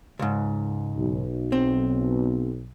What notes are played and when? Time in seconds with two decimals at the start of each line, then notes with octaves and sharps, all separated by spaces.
0.19 C#2 G#2
0.96 B1
1.52 C4